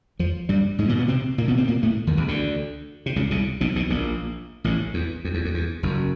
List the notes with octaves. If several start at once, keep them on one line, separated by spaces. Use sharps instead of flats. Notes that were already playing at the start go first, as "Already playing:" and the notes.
F2 F3
G2 G3
G#2 G#3
A#2 A#3
B2 B3
C3 C4
A#2 A#3
B2 B3
C3 C4
A#2 A#3
A2 A3
D#2 D#3
C#2 C#3
D2 D3
C3
C#2 C#3
C2 C3
B1 B2
B1 B2
A#1 A#2
A1 A2
E2
F2
E2
F2
E2
F#1 F#2